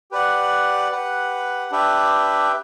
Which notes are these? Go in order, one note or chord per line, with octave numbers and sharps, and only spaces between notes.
G4 B4 D5 F#5
G4 B4 F#5
D4 G4 B4 E5 G5